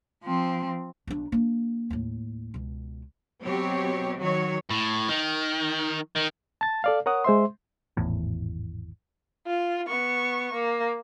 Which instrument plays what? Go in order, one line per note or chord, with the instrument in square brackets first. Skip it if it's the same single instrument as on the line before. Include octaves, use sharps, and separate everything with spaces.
[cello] F3 C4
[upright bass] B1 D4
A#3 D4
D#2 A2
C#2 B2
[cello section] B2 F#3 C4 G4 C#5
D#3 F#3 F#4 C#5
[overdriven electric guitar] A2
D#3
D#3
[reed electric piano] A5 A6
A4 D5 F5
A#4 C#5 F#5 D#6
G#3 C5 E5 C6
[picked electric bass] G#1 E2 A2
[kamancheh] F4
B3 C#6
A#3